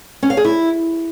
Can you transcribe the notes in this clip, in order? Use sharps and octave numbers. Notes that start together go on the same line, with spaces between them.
C#4
F5
G#4
E4